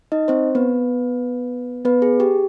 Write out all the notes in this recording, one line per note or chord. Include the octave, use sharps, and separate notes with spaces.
D#4 D#5
C4 C5
B3 B4
B3 B4
G#4
G4